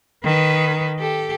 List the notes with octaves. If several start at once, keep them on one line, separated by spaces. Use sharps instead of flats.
D#3 B4
G4 A4